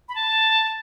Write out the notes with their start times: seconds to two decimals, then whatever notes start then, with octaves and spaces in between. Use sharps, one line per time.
0.09 B5
0.15 A5